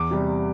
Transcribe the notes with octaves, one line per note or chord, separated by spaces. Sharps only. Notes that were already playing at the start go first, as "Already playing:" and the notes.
Already playing: E2 D6
C3 G3